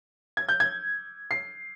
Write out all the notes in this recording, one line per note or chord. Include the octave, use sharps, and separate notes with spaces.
G#6
G6
G#6
C7